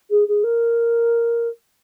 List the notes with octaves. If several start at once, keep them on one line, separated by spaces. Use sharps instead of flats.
G#4
G#4
A#4